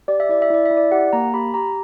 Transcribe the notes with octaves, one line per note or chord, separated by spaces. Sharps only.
G4 D5
E5
E4 D5
E5
E4 D5
E5
E4
D5
G4 F#5
A#3 A#5
G4 B5
G4 A#5